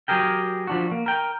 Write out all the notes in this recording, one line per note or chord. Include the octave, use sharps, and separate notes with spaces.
F#3 G4 G#4 A#4 G5
F3 D4 F#4
A#3
A#4 G5